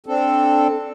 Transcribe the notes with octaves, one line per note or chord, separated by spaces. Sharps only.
C4 D4 A4